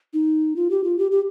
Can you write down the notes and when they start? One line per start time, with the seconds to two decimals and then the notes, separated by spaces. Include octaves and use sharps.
0.14 D#4
0.56 F4
0.70 G4
0.84 F4
0.99 G4
1.12 G4